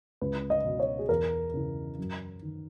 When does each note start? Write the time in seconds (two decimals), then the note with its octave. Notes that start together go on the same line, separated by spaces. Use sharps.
0.21 C#2 B4
0.50 D#5
0.65 B2
0.80 C#5
0.99 G#4
1.09 E2 A#4
1.54 C#3 E3
1.98 F#2
2.42 D#3